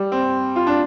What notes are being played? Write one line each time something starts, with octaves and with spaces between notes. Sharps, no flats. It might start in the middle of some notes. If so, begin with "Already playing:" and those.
Already playing: G3
C4
F4
D4